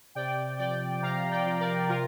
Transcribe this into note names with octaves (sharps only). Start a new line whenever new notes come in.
C3 D5 G5
F3 D5 G5
C3 F5 A#5
D5 G5
F3
A#4 D5
C3 F4 A#4